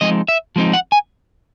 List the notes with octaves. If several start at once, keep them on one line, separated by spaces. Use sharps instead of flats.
F3 G#3 C4 D#4 D#5
E5
F3 G#3 C4 D#4
F#5
G#5